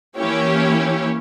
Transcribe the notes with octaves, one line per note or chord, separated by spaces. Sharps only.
E3 A#3 C#4 E4 G4 C#5